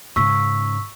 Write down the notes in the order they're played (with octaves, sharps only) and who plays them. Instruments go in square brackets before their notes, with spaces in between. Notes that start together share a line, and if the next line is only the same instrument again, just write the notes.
[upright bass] G#2 C#3 [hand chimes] C#6 E6 B6